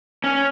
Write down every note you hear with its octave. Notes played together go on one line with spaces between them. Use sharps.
C#4